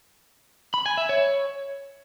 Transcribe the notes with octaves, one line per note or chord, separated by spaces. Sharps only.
B5
G#5
E5
C#5